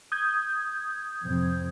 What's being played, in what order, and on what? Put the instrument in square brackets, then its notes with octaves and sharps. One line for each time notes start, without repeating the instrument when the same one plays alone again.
[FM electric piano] D#6 G6 G#6
[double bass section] F2 C3 C4